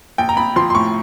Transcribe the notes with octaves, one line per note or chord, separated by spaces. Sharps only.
A#1 G5
A#5
A#1 B5
F3 C6
C6
A2 C#6